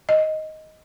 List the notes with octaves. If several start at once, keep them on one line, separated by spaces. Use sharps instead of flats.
D#5